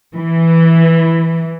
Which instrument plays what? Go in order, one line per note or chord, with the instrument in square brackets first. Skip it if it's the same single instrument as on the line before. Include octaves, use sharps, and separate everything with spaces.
[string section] E3